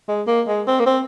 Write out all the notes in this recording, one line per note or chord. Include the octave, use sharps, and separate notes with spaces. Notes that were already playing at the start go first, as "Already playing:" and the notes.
G#3
A#3
G#3
C4
A#3
C4